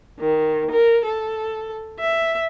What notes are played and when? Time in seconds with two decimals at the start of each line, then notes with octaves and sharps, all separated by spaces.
0.20 D#3
0.71 A#4
1.05 A4
2.00 E5